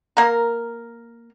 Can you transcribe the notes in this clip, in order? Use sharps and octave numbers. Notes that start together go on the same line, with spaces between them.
A#3 A#4